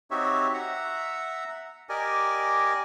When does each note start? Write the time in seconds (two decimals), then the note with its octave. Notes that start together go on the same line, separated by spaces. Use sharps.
0.11 C4 D#4 F#4 G4 C#5 E5
0.54 E5 F#5 A#5
1.89 G4 A#4 D5 D#5 G#5